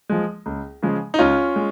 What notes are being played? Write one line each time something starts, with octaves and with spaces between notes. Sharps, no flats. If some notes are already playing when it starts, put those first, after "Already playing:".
F3 G#3
C#2
C#3 F3 G#3
D#4
C#2 C#4 F4
G#3